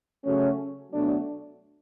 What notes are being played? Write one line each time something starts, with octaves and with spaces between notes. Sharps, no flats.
C#3 F#3 A3 C#4
B2 F#3 A3 D4